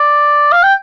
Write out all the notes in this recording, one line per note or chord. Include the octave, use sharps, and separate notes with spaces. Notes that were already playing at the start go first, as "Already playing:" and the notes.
Already playing: D5
F5
G5